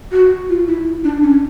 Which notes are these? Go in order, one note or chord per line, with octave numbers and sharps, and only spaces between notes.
F#4
F4
E4
D4
C#4